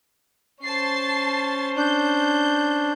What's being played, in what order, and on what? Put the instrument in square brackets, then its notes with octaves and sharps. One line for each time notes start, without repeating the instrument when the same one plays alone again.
[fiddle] C#4 C5 [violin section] A5 A6 C7
[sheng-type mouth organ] D4 [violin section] G6